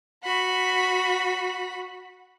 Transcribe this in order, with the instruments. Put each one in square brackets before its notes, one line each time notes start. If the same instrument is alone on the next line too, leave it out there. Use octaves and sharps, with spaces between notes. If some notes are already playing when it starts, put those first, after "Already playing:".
[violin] F#4 B5